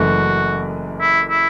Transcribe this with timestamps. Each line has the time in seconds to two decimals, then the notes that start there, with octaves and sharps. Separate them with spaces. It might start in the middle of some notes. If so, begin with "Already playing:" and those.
Already playing: F#1 F#2 E3 A3 F#4
1.01 E4
1.30 E4